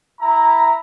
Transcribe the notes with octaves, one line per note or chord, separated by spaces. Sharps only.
E4 A#5